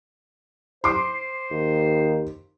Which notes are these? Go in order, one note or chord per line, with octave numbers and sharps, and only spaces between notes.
C5 C6 D6
D#2